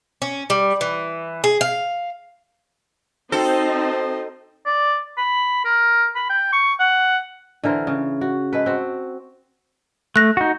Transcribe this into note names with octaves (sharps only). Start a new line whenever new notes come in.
C#4
G3
E3
G#4
F5
C4 D#4 F#4 A4 C5 D#5 G5
D5
B5
A#4
B5
G5
C#6
F#5
D3 E3 A#4 C5
C#3
F#4
G#3 A4 B4
C4 F#4
A3 F#6 A#6
D#4 F#4